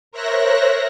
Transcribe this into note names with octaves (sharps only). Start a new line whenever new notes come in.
A#4 C5 C#5 E5 F#6 A#6